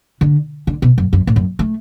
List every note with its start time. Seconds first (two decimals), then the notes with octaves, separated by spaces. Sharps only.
0.21 D3
0.67 D3
0.82 B2
0.98 F#2
1.13 F#2
1.27 A2
1.36 F#2
1.59 A3